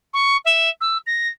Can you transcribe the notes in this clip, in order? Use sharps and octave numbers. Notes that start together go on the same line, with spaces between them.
C#6
E5
E6
A#6